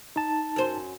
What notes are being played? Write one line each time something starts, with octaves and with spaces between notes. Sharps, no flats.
D#4 A5
F#2 C5